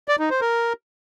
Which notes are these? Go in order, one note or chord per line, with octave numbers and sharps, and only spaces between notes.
D5
D#4
C5
A#4